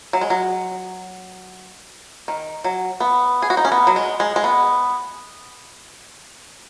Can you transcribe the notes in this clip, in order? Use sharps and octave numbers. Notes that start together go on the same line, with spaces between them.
F#3
G#3
F#3
D#3
F#3
B3
G#4
F#4
D#4
C#4
B3
F#3
G#3
G#3
G#3
B3